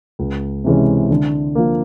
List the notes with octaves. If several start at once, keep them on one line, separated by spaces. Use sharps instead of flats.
C#2
C3 E3 G#3 C#4
D3
F3 A#3